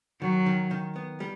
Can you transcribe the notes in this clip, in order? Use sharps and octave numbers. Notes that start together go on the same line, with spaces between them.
D#3 F#3
D#3
D#3
B3
G3